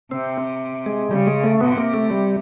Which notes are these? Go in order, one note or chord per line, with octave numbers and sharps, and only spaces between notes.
C3 C4
G#3
C#3 G3
G#3
A3
C3 B3
A#3
A3
G3